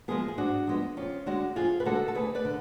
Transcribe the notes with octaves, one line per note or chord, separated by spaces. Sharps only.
F3 G#3 B3 F4 G#4
G#4
G#2 D4 F#4
F3 G#3 B3
F2 C#4 F4
D3 G#3 D4 F#4
F2 F4 G#4
B4
D3 G#3 F#4 A4
A4
D2 G#4 B4
B4 D5
D3